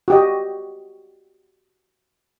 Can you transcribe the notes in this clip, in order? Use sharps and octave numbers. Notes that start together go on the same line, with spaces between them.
F#4 G4 D#5